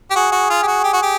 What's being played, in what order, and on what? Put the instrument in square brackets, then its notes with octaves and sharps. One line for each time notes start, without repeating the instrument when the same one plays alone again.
[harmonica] G4
[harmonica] F#4 [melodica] G#4
[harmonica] F#4
F4
G4
F#4
G4
F#4
G4